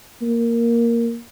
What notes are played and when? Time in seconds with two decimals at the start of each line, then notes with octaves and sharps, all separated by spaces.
0.22 A#3